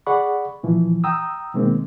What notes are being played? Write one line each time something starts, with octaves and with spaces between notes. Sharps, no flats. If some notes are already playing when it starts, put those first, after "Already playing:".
G#4 D5 F#5 B5 C#6
A#2 E3 F3
G5 A#5 D#6 E6
B2 D#3 G#3 A#3 C4